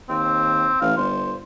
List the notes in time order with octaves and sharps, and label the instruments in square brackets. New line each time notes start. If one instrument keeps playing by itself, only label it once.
[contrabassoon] D#2 [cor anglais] C4
[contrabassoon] A1 [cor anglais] F5
[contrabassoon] G1 [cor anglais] C5